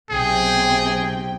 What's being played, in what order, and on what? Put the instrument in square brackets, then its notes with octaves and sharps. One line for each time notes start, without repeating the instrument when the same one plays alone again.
[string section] B1 C3 G5 [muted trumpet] G#4